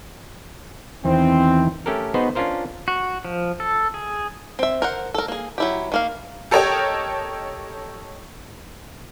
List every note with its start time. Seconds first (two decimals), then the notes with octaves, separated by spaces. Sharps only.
1.05 E2 D#3 E3 C4
1.86 A3 C#4 G4 A4 A#4
2.14 B3 D#4 F#4 G#4 B4 C5
2.35 C#4 D4 F4 A#4 C5
2.88 F#4
3.25 F3
3.60 A4
3.94 G#4
4.59 C4 E5
4.82 A#4 C5 F#5
5.14 A4 A#4
5.28 A#3 G#4
5.58 F#3 E4 G4
5.92 D#3 A#3 F5
6.51 G4 A4 A#4 C#5 D#5 G5